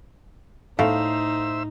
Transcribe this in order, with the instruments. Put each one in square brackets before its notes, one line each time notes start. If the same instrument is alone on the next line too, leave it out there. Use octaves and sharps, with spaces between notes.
[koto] A2 [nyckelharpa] D#4 [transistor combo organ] C5 E5 E6 [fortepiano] F5